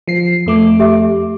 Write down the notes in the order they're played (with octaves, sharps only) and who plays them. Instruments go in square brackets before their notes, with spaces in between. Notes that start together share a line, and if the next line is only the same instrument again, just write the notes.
[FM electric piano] F3 C7
F2 A3 D6
[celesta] G4 E5